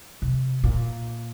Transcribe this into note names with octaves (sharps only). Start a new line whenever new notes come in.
C3
A#2